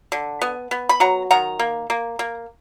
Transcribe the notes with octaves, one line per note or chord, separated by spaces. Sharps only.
D3
B3
B3
B5
F#3 F#5 A#5
D#3 F#5 A#5
A#3
A#3
A#3